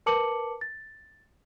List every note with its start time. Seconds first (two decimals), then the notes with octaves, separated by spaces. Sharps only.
0.06 A#4 B4 A5 D6 C#7 F#7
0.61 A6